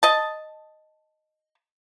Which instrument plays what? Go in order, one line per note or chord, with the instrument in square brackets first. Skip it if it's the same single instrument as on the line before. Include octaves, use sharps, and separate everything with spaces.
[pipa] D#5 A5